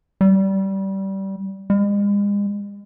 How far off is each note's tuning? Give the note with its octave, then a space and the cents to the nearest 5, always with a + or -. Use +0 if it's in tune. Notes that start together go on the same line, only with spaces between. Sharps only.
G3 -20
G#3 -40